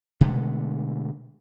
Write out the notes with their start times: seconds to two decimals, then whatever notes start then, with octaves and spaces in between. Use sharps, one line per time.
0.21 B2 D3 G#3 A3